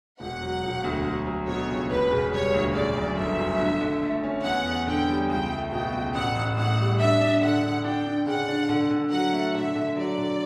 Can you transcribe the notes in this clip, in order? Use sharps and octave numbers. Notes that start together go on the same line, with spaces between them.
E1 F#5
F#3
E1
D2
F#3
F#3
B2 C#5
C#2
E1 B4
C#3
G3 C#5
D2
C#3 D5
F#2
G1 E5
F#2
D3
D3
A3
C#4
E2 F#5
E2
D3 G5
G3
C#2 G5
A3
B2 G5
C#2
A1 F#5
A1
A2 F#5
G3
D4 E5
D4
D3 F#5
D3
D4 G5
D4
C#3 F#5
D4
D3
D3
F#3 F#5
A3
D3 E5
D3
F#3 D5
D3